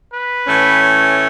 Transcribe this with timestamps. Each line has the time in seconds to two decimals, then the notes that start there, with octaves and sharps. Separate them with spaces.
0.13 B4
0.47 A2 E3 A3 C#4